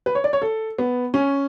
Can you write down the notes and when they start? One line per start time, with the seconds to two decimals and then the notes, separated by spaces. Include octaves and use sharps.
0.06 B4
0.15 C#5
0.24 D5
0.33 C#5
0.42 A4
0.78 B3
1.14 C#4